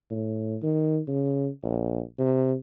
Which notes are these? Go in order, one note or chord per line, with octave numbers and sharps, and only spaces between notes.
A2
D#3
C#3
A#1
C3